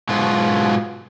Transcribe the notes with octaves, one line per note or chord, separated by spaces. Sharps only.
G#2 B2 F#3 B3 F4